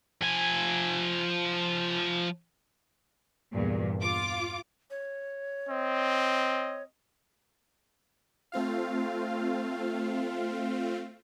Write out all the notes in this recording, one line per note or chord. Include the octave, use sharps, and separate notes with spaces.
F3 G#5
E2 G2 A#2
F4 D6
C#5
C4 D#5
A3 C4 F4 F5